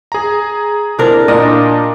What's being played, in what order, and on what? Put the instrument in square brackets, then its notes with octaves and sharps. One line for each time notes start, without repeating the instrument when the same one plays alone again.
[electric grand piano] G#4 A#5
[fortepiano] C4 [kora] D4 A#4 [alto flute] E4
[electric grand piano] A#2 D4 [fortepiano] A#4 D5 [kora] D#5